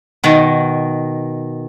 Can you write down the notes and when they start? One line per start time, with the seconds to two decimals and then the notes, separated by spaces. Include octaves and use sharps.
0.24 B2 D#3